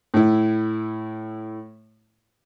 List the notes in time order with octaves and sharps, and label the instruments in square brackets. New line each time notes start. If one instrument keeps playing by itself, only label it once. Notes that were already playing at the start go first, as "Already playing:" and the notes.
[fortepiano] A2 E4